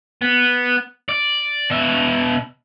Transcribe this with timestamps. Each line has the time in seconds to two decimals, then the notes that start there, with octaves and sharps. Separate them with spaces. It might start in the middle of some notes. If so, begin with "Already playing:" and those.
0.22 B3
1.09 D5
1.70 B2 E5